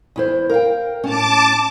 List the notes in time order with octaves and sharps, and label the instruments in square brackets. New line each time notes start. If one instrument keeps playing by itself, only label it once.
[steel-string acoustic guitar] E2 E4 C5
A#4 F5 G5
[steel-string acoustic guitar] A2 C#4 [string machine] A5 D6